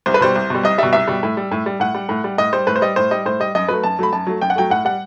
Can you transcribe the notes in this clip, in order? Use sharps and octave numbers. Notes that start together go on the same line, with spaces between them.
C2 C5
B4
B2 G3 C5
C2
B2 G3
C2 D#5
B2 G3 E5
C2 E5
B2 G3
A2
G3
A2
G3
A2 F#5
G3
A2
G3
A2 D#5
G3 C5
A2 B4
C5
G3 D#5
A2 C5
G3 D#5
A2 C5
G3 D#5
F#2 D#5
F#3 A3 B4
F#2 A5
F#3 A3 B5
F#2 A5
F#3 A3
F#2 G5
F#5
F#3 A3 G5
A2 F#5
G3 F#5